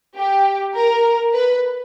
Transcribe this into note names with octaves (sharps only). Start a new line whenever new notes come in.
G4
A#4
B4